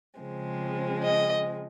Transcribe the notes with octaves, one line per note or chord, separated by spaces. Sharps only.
C#3 F3 G#3 C4
D#5